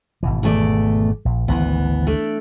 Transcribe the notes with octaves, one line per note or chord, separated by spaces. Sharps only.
G#1 B2 E3
E2 A3 D5
A#1
G#1 D2 E3 B3
A3 D4 D5